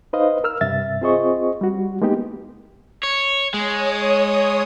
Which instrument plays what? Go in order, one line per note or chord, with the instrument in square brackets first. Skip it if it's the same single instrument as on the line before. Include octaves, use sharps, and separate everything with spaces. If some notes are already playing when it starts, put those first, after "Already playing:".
[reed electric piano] D#4 B4 C5 D#5 F5
A#4 E6 F6
G2 C3 E5 A6
C4 F4 G#4 C5 D#5 C#6
G3 F#4
G#3 A#3 B3 D#4 G4
[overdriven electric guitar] C#5
[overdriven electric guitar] G#3 [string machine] C#5 D#6